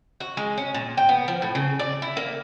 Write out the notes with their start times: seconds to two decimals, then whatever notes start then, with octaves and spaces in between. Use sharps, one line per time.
0.20 F#4
0.37 G#3
0.57 C#4
0.74 A#2
0.97 G5
1.09 B3
1.28 F3
1.42 A2
1.55 C#3
1.79 D5
2.02 E4
2.17 A#3